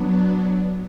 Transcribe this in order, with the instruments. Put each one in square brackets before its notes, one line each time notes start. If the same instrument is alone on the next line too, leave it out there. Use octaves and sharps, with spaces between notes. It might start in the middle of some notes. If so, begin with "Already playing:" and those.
Already playing: [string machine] F#3 B3 D4